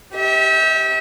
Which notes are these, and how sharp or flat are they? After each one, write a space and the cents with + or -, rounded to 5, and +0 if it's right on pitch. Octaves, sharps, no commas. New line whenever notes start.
G4 +0 E5 -35